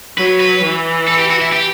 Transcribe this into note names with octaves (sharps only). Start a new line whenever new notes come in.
F#3 B4
B4
E3
A4
G4
F#4
E4
G4